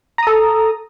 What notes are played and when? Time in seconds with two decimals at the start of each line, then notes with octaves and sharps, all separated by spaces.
0.18 A#5
0.23 D#6
0.27 A4